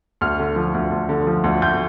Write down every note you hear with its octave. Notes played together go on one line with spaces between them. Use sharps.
D2 F6
D3
F3
D2
D2
D3
F3
D2
D2 G6